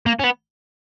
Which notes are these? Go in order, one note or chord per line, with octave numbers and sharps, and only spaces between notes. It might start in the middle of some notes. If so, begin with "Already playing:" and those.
A#3
C#4
B3